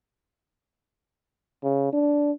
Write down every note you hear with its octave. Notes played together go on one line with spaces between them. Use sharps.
C#3
D4